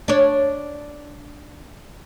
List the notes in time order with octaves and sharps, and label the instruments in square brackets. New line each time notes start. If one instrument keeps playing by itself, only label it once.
[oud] D4 C#5